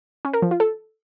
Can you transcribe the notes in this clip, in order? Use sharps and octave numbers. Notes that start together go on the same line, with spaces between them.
C#4
A#4
F3
F4
A4